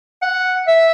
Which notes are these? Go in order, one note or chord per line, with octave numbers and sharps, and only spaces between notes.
F#5
E5